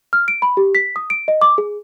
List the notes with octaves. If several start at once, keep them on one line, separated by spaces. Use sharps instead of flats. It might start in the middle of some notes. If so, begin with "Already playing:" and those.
F6
D7
B5
G4
B6
D#6
D7
D#5
D6
G#4